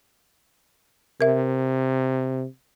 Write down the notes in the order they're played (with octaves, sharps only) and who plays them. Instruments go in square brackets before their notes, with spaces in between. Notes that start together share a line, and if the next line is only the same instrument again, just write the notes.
[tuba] C3 [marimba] A#4 E5